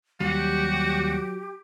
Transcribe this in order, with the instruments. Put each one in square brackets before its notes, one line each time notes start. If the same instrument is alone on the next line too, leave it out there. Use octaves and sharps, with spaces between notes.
[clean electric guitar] D#2 G3 [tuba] F#3 [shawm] F#4 [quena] G4